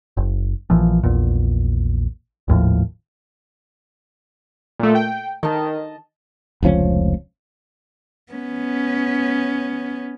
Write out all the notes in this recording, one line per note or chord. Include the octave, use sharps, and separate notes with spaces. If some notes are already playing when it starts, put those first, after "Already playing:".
F#1
A#1 A#2 E3 F3
A#1 E2 A#2
G#1 D#2 A2 F3
A#2 A3
G5
D#3 D#5 A5
F1 C#2 F3 C#4
B3 C#4